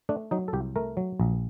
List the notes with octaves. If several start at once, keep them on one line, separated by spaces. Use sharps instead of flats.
A3 D4
F#3 D#4
A4
C2 G4
A3 A#4
F#3
A#1